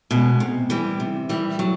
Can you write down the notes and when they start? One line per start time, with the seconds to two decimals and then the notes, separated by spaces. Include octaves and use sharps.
0.11 B2 G#3 C#4
0.40 C3
0.70 E3 G3
1.00 C3
1.29 E3 G3
1.59 F#3